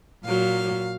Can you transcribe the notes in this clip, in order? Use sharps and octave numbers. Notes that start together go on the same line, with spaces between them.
A#2 F#3 F5